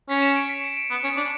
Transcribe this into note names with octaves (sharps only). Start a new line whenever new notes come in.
C#4 B6
E7
C#7
D7
B6
C#7
D7
B3 E7
C#4
D4